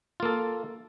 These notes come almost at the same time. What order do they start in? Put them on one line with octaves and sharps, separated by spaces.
F4 A#3 A4